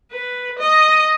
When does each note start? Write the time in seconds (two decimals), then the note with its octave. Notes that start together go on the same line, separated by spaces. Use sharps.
0.12 B4
0.59 D#5